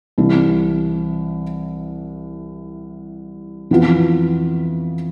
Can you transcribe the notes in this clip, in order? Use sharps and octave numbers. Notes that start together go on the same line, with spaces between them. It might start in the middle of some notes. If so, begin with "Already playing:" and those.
C2 C3 E3
F2 E3 B3 F4